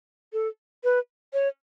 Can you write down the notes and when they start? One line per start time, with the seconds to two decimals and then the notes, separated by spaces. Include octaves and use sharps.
0.33 A4
0.84 B4
1.33 C#5